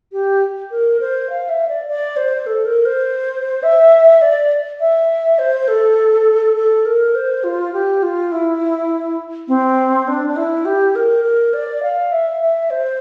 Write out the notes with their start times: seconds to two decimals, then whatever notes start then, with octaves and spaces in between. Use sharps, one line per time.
0.12 G4
0.71 A#4
1.00 C5
1.30 F5
1.49 E5
1.68 D5
1.88 D5
2.17 C5
2.47 A4
2.65 A#4
2.86 C5
3.63 E5
4.22 D5
4.80 E5
5.39 C5
5.68 A4
6.56 A4
6.85 A#4
7.15 C5
7.44 F4
7.73 G4
8.03 F4
8.32 E4
9.48 C4
10.08 D4
10.28 D4
10.36 E4
10.65 G4
10.95 A#4
11.24 A#4
11.54 D5
11.83 F5
12.12 E5
12.41 E5
12.70 C5